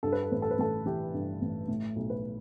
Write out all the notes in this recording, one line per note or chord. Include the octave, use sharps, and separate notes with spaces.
G2 A4
B4
A4
A1 B4
A4
B4
A1 A4
E3 G4
G2
A1
A2
B1
B4